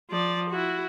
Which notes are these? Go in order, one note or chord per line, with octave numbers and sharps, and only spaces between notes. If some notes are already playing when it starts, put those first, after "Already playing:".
F3 D5
E4 F#4